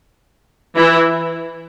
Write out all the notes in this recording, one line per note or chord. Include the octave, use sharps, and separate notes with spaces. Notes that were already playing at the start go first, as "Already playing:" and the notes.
E3 E4